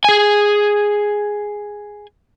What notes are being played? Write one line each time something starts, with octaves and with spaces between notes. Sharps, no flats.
G#4 G#5